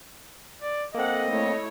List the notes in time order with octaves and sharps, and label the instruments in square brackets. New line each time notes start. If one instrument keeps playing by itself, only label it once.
[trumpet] D5
[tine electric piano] A#3 C4 [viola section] A4 F#5 [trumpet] D#5
[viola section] A3 E4 C#5